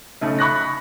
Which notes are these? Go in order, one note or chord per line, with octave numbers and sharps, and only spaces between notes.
B1 C#3 A3
B5 C#6 F#6 A#6